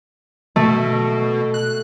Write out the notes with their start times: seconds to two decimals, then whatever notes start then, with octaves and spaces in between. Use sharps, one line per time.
0.56 B2 A3
1.54 F#6